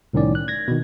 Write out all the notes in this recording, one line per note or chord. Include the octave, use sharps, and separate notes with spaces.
C2 A2 D#3 C#4 D5
F#6
G#6 A#6
B2 D#3